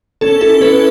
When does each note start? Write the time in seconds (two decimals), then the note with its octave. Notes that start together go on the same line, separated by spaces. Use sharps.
0.21 C#4 A4
0.41 E4 A4
0.61 C#4 B4